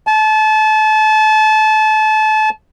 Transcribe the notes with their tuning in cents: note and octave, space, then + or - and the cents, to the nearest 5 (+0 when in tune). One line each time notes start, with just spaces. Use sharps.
A5 -30